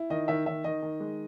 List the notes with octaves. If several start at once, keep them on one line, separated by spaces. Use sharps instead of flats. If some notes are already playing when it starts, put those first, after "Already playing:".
Already playing: E4
D#3 D#5
D#3 E5
D#3 E5
D#3 D#5
D#3
G#3